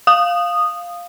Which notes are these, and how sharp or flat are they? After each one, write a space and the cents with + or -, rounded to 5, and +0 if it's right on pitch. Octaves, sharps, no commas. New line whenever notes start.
F5 +0 D#6 -10